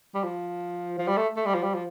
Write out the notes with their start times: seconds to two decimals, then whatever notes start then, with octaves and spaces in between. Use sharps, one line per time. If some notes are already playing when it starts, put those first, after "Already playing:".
0.14 G3
0.24 F3
0.99 F3
1.08 G3
1.17 A3
1.37 A3
1.46 G3
1.54 F3
1.63 G3
1.74 F3